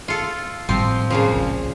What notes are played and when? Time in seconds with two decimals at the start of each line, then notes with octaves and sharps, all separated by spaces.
0.08 F4 A4
0.69 G#1 A2 F3 G3 C4
1.10 A#2 C#3 F3
1.33 C#2